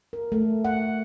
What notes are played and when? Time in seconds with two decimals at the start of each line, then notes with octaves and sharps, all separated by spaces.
0.13 A#4
0.32 A3
0.65 F#5